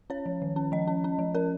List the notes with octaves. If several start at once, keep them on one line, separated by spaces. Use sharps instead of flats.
C#4 C#5
F3
D#3
C#4
F3 D#5
C#4
C#4
F3
C#4 A#4